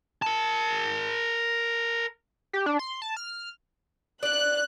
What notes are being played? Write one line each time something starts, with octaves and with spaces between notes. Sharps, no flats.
A#4 A5
G4
D4
C6
A5
F6
D4 D5 F#6